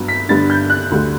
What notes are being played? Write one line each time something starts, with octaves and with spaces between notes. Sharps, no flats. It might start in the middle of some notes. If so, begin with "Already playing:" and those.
Already playing: G2 F#3 B3
B6
G2 D3 G3 B3 A6
G6
F#6
D2 D3 G3